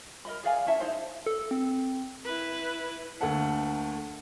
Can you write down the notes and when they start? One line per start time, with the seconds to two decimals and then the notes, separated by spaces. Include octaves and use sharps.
0.25 A#4 D#5 B5
0.43 G#4 D5 F5 G#5
0.66 C#4 E4 E5 A5
0.79 D#4 E4 C5 E5
1.26 A4
1.51 C4
2.25 E4 B4
3.21 D2 A3 A#3 F#5 A5